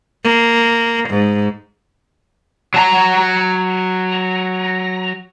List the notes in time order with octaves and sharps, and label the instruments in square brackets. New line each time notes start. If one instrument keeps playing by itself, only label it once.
[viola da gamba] A#3
G#2
[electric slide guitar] F#3 A5 A#5